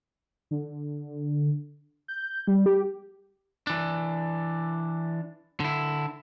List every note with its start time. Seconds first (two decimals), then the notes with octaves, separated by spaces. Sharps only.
0.51 D3
2.08 G6
2.47 G3
2.66 G4
3.67 E3 D4
5.60 D3 E4